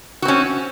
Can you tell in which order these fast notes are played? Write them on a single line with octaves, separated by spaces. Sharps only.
F#4 C4 C#4